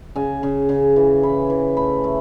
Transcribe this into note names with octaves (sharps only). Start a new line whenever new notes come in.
C#3 G#5
C#3
C#3
E3
E3 B5
E3
A3 B5
A3